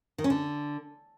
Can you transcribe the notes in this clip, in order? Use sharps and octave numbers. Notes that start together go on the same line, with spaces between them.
D#3
C#4
D3